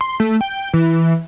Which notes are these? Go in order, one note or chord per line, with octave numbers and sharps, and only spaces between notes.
C6
A3
G5
E3